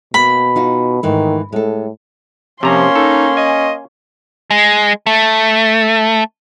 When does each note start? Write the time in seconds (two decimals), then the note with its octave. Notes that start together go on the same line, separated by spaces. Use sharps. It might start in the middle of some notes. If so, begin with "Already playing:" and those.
0.14 B2 A#3 B5
0.56 D#4 F4 F#4
1.03 G#2 D#3 E3 A3
1.53 A2 G#3 A4
2.63 C3 F3 A#3 C#4 A#5 C6
2.96 D#4 A4
3.37 D#5 G#5
4.51 G#3
5.07 A3